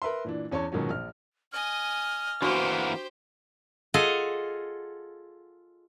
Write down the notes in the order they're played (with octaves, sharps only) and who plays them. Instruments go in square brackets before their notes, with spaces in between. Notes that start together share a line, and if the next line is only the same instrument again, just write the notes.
[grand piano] A#4 B4 E5 C6
A#2 E3 D4
E2 C#4 C#5 A5 C#6
G#2 B2 D#3 F3 F#3 C#4
A#1 F6
[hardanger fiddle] D#5 G#5 [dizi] F6
[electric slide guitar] E3 A#3 B3 [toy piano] D4 F#4 C#6 [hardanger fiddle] G4 C5
[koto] F4 G#4 A4 D#5 F5 F#5